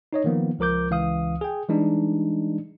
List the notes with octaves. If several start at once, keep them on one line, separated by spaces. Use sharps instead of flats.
D#4 C#5 D#5
D#3 F3 A#3 B3
C#2 F3 A#4 D6 G6
C#2 E3 F5 D#6
G#4 G5
E3 G3 G#3 D4 D#4